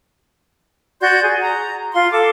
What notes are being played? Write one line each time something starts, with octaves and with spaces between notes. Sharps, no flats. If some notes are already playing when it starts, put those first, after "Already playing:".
F#4 D5 C6 G6
G#4
A#5
F4 F5 C6
A4 D6